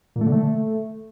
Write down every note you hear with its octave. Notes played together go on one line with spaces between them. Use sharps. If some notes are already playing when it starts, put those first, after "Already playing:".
A#2
A3
D3
A3